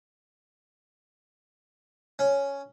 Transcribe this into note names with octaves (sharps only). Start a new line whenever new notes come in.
C#4